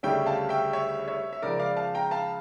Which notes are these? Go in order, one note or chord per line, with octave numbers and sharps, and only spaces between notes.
D2 C#3 G3 C#4 E5 G5
F5 A5
E5 G5
C#5 E5
C#5 E5
E5
C#2 C#3 F3 A#4 D5
D5 F5
F5 A5
G5 A#5
F5 A5